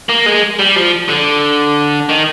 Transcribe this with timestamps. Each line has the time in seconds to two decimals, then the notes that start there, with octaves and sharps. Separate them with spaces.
0.09 A#3
0.26 G#3
0.59 G3
0.76 F3
1.09 D3
2.09 D#3